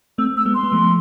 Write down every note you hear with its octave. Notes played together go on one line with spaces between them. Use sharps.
A3 C4 E6
E6
G#3 B3
C6
B3
F3 A3